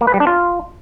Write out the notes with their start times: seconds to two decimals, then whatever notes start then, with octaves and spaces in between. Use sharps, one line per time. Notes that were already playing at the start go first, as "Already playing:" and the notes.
0.01 A#3
0.07 B4
0.14 G3
0.20 D4
0.27 F4